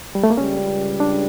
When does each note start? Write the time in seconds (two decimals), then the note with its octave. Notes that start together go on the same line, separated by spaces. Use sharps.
0.15 G3
0.24 A3
0.30 A#3
0.37 C#2 C#3 G3 C#4
1.00 D4